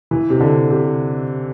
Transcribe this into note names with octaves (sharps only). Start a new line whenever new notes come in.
E3
C3
D3
C3